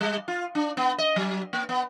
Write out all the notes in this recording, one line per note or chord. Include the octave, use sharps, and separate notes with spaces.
G3
F4
D4
B3
D#5
F#3
A#3
B3